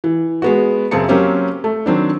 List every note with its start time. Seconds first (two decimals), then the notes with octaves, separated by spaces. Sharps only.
0.04 E3
0.42 G#3 B3 F#4
0.91 F#2 C#3 C4 G#4 A5 C#7
1.08 F#3 A#3 C4 C#4 G4
1.64 A3
1.86 D#3 F#3 C4 D4